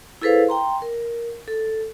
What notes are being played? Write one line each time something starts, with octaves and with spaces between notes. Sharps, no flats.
E4 G#4 A4 B4 C5 F5
G5 A#5 C6
A#4
A4